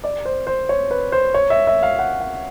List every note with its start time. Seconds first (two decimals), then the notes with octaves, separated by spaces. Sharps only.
0.04 D5
0.25 C5
0.47 C5
0.69 C#5
0.91 B4
1.12 C5
1.34 C#5
1.50 E5
1.67 E5
1.83 F5
1.99 F#5
2.21 F#5